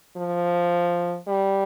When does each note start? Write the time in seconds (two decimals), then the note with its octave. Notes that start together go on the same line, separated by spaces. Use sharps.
0.17 F3
1.27 G3